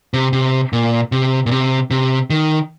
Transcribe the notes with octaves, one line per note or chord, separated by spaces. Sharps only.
C3
C3
A#2
C3
A#2
C3
C3
D#3